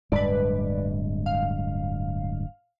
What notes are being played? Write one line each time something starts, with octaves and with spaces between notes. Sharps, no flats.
D1 G2 G#3 B4 D5
F5